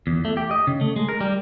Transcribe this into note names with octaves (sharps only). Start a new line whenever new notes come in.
E2
A3
G4
D#5
C#3
A3
G#3
A#4
G3